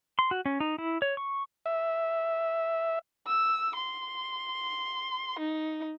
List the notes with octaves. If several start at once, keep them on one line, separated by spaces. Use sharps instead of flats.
C6
F#4
C#4
D#4
E4
C#5
C#6
E5
E6
C6
D#4